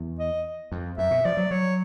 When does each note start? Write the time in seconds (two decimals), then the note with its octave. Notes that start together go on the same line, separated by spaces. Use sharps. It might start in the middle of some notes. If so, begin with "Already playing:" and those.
Already playing: E2
0.19 D#5
0.72 F2
0.98 F#2 E5
1.11 B2
1.25 F3 D5
1.37 F#3
1.51 F#3 C#5